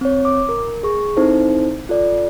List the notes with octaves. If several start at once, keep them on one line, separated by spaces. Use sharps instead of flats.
C4 C#5
D6
A#4
G#4 C#6
C4 D#4 E4 A4 C5
F4 A4 D5